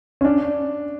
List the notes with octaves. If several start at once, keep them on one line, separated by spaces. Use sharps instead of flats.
C#4
D4